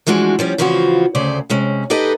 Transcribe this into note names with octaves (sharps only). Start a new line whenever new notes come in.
E3 F3 G#3 D4 F#4
F3 G3 C#4
C#3 E3 F3 C4 F4 F#4
D2 C#3 C5 D5
C3 G#3 C#4
D#4 G4 A4 B4 D#5